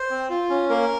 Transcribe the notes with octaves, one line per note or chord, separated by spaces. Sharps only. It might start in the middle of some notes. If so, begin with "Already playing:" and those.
Already playing: C5
C4
F4
C#4
A#3 A#4